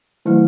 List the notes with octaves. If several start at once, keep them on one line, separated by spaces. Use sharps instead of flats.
D#3 E3 F#3 A3